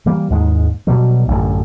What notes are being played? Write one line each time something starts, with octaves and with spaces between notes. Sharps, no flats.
E3 G3 A#3
D#2 G#2 G#3
B2 F#3 G3
A1 F#2 D3